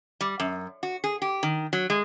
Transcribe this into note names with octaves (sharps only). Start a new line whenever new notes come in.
G3
F#2
F#4
G#4
G4
D#3
F#3
G#3